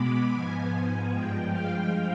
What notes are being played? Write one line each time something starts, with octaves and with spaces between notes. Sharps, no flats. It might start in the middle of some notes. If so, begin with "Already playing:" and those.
Already playing: B2 G#3 B3 B5 D6
G#2 F3 B3 G#5
G2 F3 G#3 G5
F5